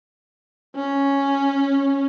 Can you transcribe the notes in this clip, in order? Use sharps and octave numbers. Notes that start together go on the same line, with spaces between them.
C#4